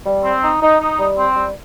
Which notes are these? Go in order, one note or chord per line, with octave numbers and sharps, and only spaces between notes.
G3
C4
D#4
D#4
D#4
G3
C4
G3